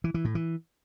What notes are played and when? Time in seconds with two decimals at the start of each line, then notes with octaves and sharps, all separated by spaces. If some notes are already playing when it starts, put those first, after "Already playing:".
0.04 E3
0.14 E3
0.25 A2
0.35 E3